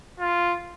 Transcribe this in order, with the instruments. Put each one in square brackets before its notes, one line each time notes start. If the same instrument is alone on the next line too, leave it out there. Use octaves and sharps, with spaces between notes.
[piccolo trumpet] F4